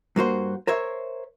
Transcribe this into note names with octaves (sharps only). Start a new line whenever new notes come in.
G2 A#3 F#4 C5
A#4 C5 C#5 E5